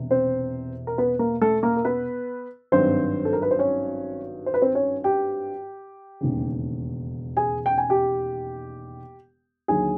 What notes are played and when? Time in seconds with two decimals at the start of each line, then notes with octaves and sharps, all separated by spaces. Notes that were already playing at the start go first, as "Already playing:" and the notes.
Already playing: E1 E2 C3
0.11 C4 C5
0.87 A#4
0.98 B3 B4
1.19 A#3 A#4
1.41 A3 A4
1.63 A#3 A#4
1.77 A#4
1.85 B3 B4
2.72 G#1 G2 D#3 F#3 C4 C5
3.25 A4
3.33 A#4
3.42 B4
3.51 C5
3.59 C#4 C#5
4.46 C5
4.54 B4
4.62 C4 C5
4.75 C#4 C#5
5.04 G4 G5
6.21 E1 D#2 C#3
7.37 G#4 G#5
7.66 G5
7.78 G#5
7.90 G4 G5
9.68 D#2 D3 F#3 G#4 G#5